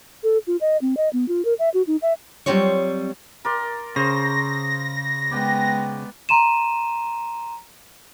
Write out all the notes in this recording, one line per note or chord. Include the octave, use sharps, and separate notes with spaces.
A4
F4
D#5
C4
D#5
B3
F4
A#4
E5
F#4
D#4
E5
F#3 G3 A3 C4 F4 C#5
A#4 D5 C6
C#3 C5 A#6
G#3 B3 D5 G5
A#5 C6 D#7 E7